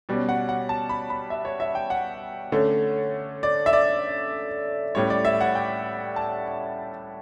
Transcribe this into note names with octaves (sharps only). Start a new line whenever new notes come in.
B2 G3 C#4
F#5
F#5
A5
B5
B5
E5
C#5
E5
G5
F#5
D3 A3 C#4
D5
E5
D5
A2 G3 C#4 C#5
D5
E5
F#5
G5
A5